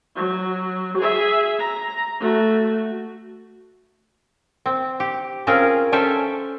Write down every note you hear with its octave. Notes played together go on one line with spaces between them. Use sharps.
F#3
G#4 E5
A#5
A3 F#4
C4
G4
C4 C#4 F4 G#4 A#4
C#4 A4 C5 E5 G5 G#5